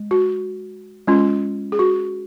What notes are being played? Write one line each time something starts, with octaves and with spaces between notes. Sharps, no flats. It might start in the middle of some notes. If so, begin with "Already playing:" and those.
Already playing: G#3
F#4
G#3 C#4 F4
G#4
F#4